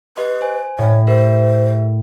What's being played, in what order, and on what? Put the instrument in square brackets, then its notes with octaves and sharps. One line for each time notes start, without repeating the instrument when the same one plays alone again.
[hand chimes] G4 D#5 C6 [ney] B4
[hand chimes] C5 G#5
[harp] A2 [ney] C#5
[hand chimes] G4 A#4 E5 [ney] C5